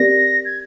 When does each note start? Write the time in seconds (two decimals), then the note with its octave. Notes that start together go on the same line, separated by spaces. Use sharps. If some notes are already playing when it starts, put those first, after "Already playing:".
Already playing: C4 G4 A#4 D5 A#6
0.45 G#6